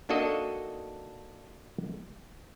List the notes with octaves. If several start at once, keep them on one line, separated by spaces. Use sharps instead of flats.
A#3 D4 D#4 F#4 A4 D#5